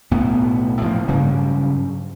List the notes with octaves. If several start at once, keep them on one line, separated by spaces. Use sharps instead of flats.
B1 A2 B3
A2 F3 A#3
G2 C#3 F#3 G3